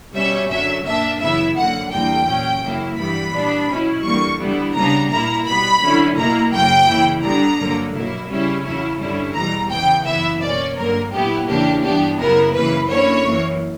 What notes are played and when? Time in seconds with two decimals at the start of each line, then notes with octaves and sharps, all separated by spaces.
0.14 B2 G3 C#4 E5
0.50 F#2 D3 F#3 C#4 E5
0.85 A#2 A#3 D4 E5
1.21 F#2 C#3 E3 B3 E4 E5
1.56 F#2 D3 A#3 F#5
1.91 E2 D3 G3 A#3 G5
2.27 A#2 F#3 C#4
2.62 F#2 C#3 F#3 A#3 E4
2.98 G2 E3 G3 B3 B5
3.33 A#2 G3 B3 D4
3.68 B2 F#3 C#4 E4
4.04 E2 D3 G3 A#3 C#6
4.39 D3 G3 B3 E4
4.75 C#3 G3 B3 D4 A#5
5.10 A#2 A#3 E4 A#5
5.46 B2 G3 B3 B5
5.81 D3 F#3 C#4 E4
6.16 B2 A#3 E4 A#5
6.51 F#2 C#3 F#3 A#3 G5
6.87 C#3 E3 A#3 E4
7.22 D3 G3 B3 D4 A#5
7.58 G2 D3 F#3 A#3
7.94 B2 F#3 A#3 E4
8.29 C#3 G3 C#4 E4
8.64 E2 C#3 F#3 C#4 E4
9.00 G2 D3 G3 C#4 E4
9.35 E2 B2 G3 B3 A#5
9.70 C#3 E3 B3 G5
10.06 F#2 E3 B3 E4 E5
10.41 B2 A#3 C#4 D5
10.77 G2 D3 F#3 A#3 A#4
11.12 A#2 F#3 B3 E4 G4
11.48 E2 C#3 E3 A#3 D4 G4
11.83 G2 E3 B3 D4 G4
12.18 F#2 C#3 G3 B3 E4 A#4
12.54 F#2 C#3 E3 A#3 B4
12.89 D3 A#3 C#4 E4 C#5
13.25 F#2 E3 A#3